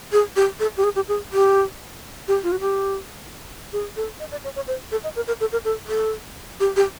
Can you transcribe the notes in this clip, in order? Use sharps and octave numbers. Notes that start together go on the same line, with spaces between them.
G#4
G4
A4
G4
G#4
G4
G#4
G4
G4
F4
F#4
G4
G#4
A4
D#5
D5
C#5
C#5
C5
A4
D#5
A#4
A#4
A4
A#4
A4
A4
G4
G4